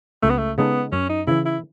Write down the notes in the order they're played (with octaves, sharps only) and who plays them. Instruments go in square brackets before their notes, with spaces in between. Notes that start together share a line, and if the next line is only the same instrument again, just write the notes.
[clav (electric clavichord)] C#2 [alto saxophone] A3
[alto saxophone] B3
A3
[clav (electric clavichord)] C#3 G#3 D#4 A4 [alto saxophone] B3
[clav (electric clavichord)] F#2 [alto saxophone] C#4
[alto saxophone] D#4
[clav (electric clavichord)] C#3 E3 [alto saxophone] E4
[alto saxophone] E4